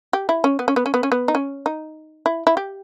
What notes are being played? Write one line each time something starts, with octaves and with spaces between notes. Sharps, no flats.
G4
E4
C#4
B3
C#4
B3
C#4
B3
C#4
B3
D#4
C#4
D#4
E4
E4
G4